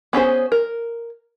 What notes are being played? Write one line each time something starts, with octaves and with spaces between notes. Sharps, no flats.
B3 C#4 G#4 C5
A#4